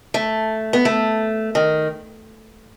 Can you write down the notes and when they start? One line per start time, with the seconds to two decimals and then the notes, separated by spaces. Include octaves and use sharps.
0.14 A3
0.73 B3
0.85 A3
1.55 D#3